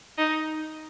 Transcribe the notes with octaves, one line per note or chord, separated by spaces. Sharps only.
D#4